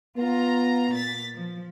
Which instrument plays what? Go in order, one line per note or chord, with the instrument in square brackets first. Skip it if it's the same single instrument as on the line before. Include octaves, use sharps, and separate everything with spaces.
[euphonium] B3 [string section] F4 A#5
[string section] A#2 A6 B6
F3